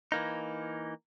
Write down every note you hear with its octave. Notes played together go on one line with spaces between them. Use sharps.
E3 A#3 D#4